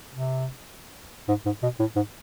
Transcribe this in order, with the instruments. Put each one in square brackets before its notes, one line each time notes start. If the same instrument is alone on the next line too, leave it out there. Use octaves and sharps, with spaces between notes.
[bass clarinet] C3
G#2
G#2
B2
A2
G#2